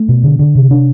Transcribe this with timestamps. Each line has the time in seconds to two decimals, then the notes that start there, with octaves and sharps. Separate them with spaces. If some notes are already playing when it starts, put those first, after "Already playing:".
Already playing: A3
0.09 B2
0.23 D3
0.39 D3
0.55 C3
0.71 D4